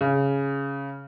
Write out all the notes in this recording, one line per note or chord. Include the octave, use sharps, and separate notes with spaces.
C#3